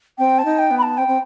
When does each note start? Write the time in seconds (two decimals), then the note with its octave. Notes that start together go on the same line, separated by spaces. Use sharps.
0.18 C4 G5
0.38 A5
0.45 D#4
0.58 G5
0.71 B3
0.78 B5
0.82 A5
0.97 C4 G5
1.08 C4